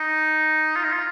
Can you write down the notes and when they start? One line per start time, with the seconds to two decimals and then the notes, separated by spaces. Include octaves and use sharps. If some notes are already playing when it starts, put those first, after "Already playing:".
Already playing: D#4
0.75 F4
0.84 D#4
0.92 F4